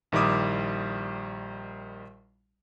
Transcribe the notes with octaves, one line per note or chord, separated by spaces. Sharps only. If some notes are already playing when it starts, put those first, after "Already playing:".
A#1 D#3 G3 E4 D6 D#6